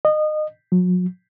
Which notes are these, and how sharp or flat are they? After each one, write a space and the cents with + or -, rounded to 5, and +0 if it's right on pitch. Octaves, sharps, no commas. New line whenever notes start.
D#5 -25
F#3 -40